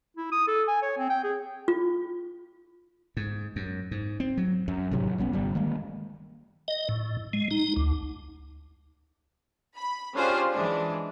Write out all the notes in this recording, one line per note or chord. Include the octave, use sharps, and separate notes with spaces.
E4
D#6
A4
G#5
C#5
C4
G5
G#4
F4
G#2
F#2
G#2
C4
F#3
F#2
G#1 A2 C3 F#3
A#1 G3 B3 C#4
G1 G3
D#3 G#3 A#3
D#5
A2
G#3
D#4
D2
B5
C#4 D4 F4 G4 G#4 C5
E3 G#3 D4